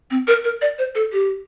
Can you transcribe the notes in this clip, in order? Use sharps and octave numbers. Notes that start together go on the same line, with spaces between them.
C4
A#4
A#4
D5
C5
A4
G4